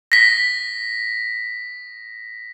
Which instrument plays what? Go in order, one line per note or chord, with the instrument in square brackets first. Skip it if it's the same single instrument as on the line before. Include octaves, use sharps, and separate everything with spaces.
[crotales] A#6 B6